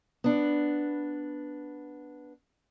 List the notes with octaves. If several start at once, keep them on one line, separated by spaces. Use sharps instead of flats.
B3 D4